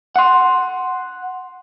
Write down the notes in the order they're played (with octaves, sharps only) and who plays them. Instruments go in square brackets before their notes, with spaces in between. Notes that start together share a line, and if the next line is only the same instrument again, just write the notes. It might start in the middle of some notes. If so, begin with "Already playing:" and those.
[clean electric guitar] F#5 C6